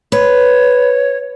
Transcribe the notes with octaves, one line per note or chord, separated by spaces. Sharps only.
B4 C#5